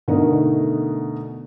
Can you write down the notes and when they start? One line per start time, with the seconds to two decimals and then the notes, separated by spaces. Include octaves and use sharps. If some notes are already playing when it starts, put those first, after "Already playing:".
0.08 B2 D3 A3 D#4 A#4